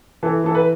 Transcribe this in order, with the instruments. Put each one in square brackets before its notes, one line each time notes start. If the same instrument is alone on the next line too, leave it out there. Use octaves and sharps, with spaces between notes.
[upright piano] E3 A4
E3 A4
B4